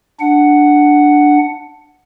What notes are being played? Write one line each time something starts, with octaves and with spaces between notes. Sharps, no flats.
D4 F#5